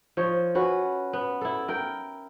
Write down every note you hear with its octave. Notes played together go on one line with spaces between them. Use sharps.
F3 C#5 D#5
C#4 F#4 B4
B3
E4 A4
A#4 G5